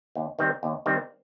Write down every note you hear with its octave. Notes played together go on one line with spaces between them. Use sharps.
D#2
D#3 G3 C4
D#2
D#3 G3 C4